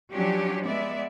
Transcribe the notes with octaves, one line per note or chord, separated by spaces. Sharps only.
F3 F#3 C#4 D4 G4
G#3 B3 D5 E5